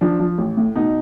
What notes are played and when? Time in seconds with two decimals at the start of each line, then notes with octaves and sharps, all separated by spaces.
0.01 F3 D4
0.19 F3
0.38 A1
0.57 A2
0.76 B2 D#4